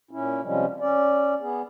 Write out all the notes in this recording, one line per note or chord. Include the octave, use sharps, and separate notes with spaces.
A#2 C#4 E4
C3 F3 G3 G#3 C#4
C#4 D5
B3 G#4